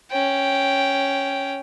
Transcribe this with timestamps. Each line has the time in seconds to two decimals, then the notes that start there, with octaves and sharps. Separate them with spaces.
0.11 C#4 G5